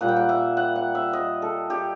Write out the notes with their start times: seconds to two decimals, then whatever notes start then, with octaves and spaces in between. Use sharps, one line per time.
0.01 A#2 G3 A#3 F#5
0.08 G5
0.16 F#5
0.29 E5
0.57 F#5
0.76 F#5
0.95 E5
1.13 D#5
1.42 A4
1.70 G4